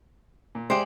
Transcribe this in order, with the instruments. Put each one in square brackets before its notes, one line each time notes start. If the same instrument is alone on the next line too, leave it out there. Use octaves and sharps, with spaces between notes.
[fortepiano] A#2
[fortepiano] G#3 G4 E5 [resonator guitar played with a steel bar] C5 D5